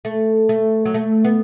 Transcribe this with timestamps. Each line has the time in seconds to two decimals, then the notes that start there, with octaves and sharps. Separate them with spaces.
0.05 A3
0.49 A3
0.85 F#3
0.94 A3
1.25 B3